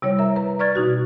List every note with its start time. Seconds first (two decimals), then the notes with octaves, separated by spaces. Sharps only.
0.02 C3 G3 E4 C#5
0.19 A#4 E5 A#5
0.36 B4 A#5
0.59 B4 D5 C#6 F6 G#6 A6
0.75 B2 D#4 F#4